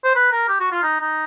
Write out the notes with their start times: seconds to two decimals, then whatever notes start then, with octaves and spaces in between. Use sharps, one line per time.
0.04 C5
0.15 B4
0.32 A#4
0.49 G4
0.60 F#4
0.72 F4
0.83 D#4
1.01 D#4